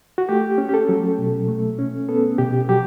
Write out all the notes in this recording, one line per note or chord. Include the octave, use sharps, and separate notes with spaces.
F#4
A3 G4
C#4
G4
A4
F#3
B2
A3
C#4
B3 A4
B2 G4
F#3 G4